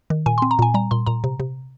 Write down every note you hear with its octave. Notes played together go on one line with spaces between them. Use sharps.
D#3
A#2 G#5
C4 C6
A#5
A#2 G#5
G3 A#5
A#2 C6
A#2 A#5
C3
C3